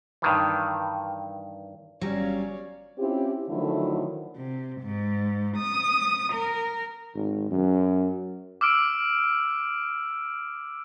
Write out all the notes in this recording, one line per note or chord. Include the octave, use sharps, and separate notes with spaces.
G2 D#3 E3
G1 F#3 G3 C#4 C#5 D5 F5
C4 C#4 E4 F4 G4
D3 D#3 F3 F#3 A3 E4
C3
G#2
D#6
A#4
G#1
F#2
D6 E6 F6 D7